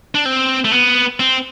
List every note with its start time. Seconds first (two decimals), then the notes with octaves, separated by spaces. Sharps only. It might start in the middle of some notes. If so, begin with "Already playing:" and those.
0.15 D4
0.25 C4
0.65 A3
0.72 B3
1.20 C4